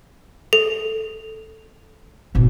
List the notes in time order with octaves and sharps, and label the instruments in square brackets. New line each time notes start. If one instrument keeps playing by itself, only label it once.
[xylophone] A4
[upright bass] G#1 B2